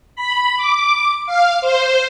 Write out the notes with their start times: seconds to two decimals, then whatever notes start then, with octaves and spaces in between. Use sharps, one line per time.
0.16 B5
0.57 D6
1.26 F5
1.61 C5